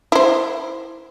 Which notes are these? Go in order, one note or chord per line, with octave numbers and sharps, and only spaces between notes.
E4 C5